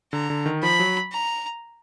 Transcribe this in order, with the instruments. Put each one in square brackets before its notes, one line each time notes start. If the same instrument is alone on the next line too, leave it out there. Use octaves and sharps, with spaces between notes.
[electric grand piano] D3 [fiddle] A#5
[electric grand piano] D3
D#3
[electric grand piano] F3 [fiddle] B5
[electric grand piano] F#3
[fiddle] A#5